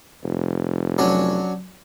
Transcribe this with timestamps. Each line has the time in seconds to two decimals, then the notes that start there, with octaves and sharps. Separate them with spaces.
0.23 F1
0.98 F#3 C#4 D4